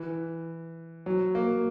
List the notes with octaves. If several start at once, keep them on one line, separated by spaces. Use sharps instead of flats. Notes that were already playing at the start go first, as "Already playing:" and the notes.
Already playing: E3
F#3
A#3